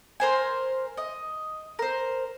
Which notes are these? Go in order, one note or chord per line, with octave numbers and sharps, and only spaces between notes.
A#4 C5 G#5
D#5
A#4 C5